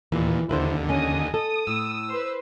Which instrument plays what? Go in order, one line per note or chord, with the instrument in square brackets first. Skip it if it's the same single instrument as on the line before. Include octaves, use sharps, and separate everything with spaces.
[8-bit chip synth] D#2 A#2 [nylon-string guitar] E3
[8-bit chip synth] D#2 D3 [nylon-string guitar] E4 B4 C5
[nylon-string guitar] C#4 [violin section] D#5 G#5 D#6
[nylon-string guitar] A4 [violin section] D#6
[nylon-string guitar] A2 [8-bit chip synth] E6
[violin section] B4 C5